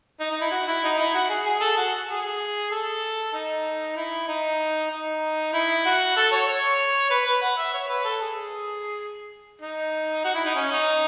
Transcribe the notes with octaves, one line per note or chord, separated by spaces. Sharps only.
D#4
D#4
E4
F#4
E4
D#4
E4
F#4
G#4
G#4
A4
F#4
G#4
A4
D#4
E4
D#4
D#4
E4
F#4
A4
C#5
C#5
B4
B4
F#5
E5
C#5
B4
A4
G#4
D#4
F#4
E4
D#4
C#4
D#4